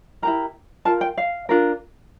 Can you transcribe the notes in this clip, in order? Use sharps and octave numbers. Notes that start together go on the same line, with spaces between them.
E4 G4 A#4 A#5
F4 A#4 A5
G5
F5
D4 F4 A#4